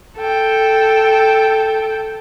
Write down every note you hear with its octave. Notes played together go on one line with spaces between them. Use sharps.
A4 G5